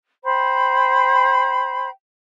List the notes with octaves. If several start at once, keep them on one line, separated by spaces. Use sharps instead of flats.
C5 G5 B5